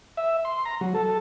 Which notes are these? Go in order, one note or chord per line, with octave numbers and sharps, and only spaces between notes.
E5
C6
A#5
F#3
A4